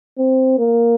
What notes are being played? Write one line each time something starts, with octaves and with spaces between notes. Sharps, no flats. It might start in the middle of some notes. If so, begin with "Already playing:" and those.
C4
A#3